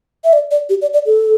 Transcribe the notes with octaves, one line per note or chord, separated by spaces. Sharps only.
E5
D5
D5
G4
D5
D5
A4